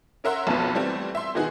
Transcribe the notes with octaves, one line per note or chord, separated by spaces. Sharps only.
C#4 A#4 E5 F#5 C6
B1 F2 B2 B4
E3 G3 A3 C4
E5 C6
B2 D#3 E3 D#4 F#4 G#4